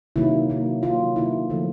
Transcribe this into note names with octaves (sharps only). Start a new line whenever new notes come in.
C3 D#3 F#3 A#3 E4
C3 D#3 F#3 A#3
C3 D#3 F#3 A#3 F4
C3 D#3 F#3 A#3 E4
D3 F3 A3